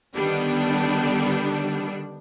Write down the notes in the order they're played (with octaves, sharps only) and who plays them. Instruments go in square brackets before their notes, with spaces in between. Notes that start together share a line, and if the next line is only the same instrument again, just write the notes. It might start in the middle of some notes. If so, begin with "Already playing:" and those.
[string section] D3 D#3 G3 B3 D4